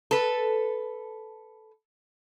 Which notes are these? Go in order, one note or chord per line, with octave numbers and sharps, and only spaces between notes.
A4 B4